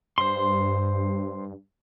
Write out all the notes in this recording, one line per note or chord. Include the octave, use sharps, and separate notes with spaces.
G2 C5 C6